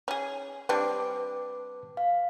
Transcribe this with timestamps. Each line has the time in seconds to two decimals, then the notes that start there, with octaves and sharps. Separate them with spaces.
0.08 C#4 G#4
0.69 G3 C4 D4 B4 D6
1.97 F5